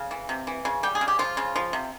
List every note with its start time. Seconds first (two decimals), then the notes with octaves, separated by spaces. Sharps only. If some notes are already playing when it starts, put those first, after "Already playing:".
Already playing: C#3 F5
0.11 E3
0.29 C3
0.47 E3
0.65 C#3
0.83 G3 G5
0.95 G#4
1.01 C#3
1.08 G4
1.19 F3 F4
1.37 C#3
1.56 F3
1.73 C3